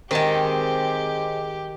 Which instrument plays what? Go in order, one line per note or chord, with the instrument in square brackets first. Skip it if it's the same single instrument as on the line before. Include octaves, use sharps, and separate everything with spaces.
[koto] D#3 A5 [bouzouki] G#3 C4 [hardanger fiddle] G4